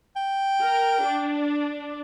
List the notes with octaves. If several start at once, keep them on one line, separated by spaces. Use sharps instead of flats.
G5
A#4
D4